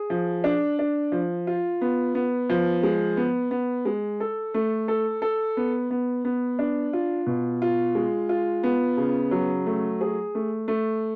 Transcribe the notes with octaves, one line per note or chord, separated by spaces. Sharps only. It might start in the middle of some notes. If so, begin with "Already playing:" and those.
Already playing: G#4
F3
D4
D4
F3
F4
B3
B3
F3
G#3
B3
B3
G#3
A4
A3
A4
A4
B3
B3
B3
D4
F4
B2
F4
G#3
F4
B3
C#3
F#3
A3
G#4
A3
A3